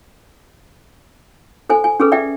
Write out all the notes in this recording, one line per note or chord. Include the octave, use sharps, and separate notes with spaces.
A4 C5 G#5
G#5
C#4 G#4 A4 B4
D5 E5 G5